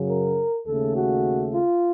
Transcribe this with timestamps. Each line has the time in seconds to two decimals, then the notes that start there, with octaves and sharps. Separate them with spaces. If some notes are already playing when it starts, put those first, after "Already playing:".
Already playing: F#2 C#3 F#3
0.09 A#4
0.67 D#2 C#3 A3 A4
0.96 F#4
1.54 F4